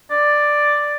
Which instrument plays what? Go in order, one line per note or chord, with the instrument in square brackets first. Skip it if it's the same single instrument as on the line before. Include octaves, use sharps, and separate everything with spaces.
[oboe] D5